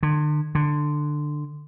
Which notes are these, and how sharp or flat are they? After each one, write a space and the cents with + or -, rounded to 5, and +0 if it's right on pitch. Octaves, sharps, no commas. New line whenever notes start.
D3 +40
D3 +15